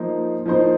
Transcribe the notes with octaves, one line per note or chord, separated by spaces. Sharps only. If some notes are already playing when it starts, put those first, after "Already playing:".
Already playing: F3 A#3 D#4 C5
F3 A#3 D#4 C5